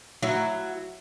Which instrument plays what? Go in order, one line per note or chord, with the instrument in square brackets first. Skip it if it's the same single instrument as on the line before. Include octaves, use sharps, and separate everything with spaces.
[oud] F#3 E4